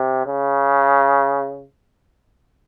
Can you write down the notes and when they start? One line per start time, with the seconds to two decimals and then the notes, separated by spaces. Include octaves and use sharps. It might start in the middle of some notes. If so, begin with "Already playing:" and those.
Already playing: C3
0.26 C#3